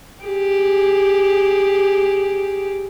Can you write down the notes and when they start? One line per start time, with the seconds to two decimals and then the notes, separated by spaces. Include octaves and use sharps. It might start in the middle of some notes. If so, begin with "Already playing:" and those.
0.24 G4 G#4